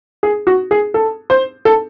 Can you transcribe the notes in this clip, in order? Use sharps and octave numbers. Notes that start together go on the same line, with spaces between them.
G#4
F#4
G#4
A4
C5
A4